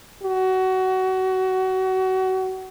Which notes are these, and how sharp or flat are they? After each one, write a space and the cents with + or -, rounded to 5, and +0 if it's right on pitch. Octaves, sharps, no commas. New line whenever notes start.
F#4 +25